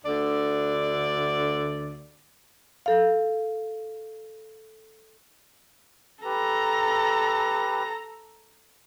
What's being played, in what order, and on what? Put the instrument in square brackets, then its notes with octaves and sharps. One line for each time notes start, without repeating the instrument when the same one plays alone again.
[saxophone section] D2 D3 D5
[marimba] A4 F5
[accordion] G4 B4 [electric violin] A4 A#5